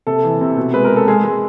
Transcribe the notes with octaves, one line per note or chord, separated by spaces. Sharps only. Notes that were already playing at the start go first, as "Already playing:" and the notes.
C3 A4
E3
C3
B2
G#3 B4
A#4
G#3
A4
G#3 G#4
G#3